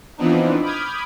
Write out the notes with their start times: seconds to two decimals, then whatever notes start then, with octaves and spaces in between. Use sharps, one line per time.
0.17 E3 F3 B3 C4 D4 D#4
0.62 B5 D6 D#6 F6 G6 G#6